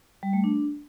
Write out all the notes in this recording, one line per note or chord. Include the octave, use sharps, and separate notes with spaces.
G3
A3
D4